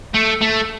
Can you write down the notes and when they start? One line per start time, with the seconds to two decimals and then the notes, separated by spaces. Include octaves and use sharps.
0.14 A3
0.41 A3